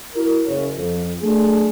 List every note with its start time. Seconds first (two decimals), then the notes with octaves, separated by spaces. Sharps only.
0.15 E4 F#4 A#4
0.46 F#1 C#4
0.77 F2
1.22 F#3 A3 D4 G#4